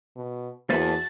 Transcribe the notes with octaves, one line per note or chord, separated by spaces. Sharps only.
B2
E2 A#3 F#4 B4 C5 E5 A5 A6